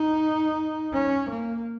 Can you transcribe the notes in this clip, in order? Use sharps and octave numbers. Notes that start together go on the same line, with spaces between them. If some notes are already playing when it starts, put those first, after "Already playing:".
Already playing: D#4
C#4
A#3